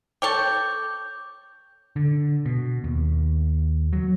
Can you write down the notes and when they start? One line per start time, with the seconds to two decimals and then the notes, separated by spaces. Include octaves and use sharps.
0.22 A4 C#5 G5 D6 G6
1.96 D3
2.46 B2
2.84 D#2
3.93 F#3